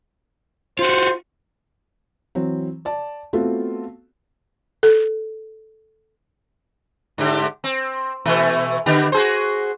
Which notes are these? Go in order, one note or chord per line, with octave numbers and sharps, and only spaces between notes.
F4 F#4 C5
E3 F#3 C4
D5 A5
A3 B3 C4 F4 F#4
A4
G#2 D3 G4
C4
B2 E3 A3
D3 B3 G4
F#4 G#4 C5